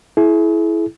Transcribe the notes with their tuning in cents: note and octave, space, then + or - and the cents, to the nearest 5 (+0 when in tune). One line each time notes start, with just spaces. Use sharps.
E4 +0 G#4 +40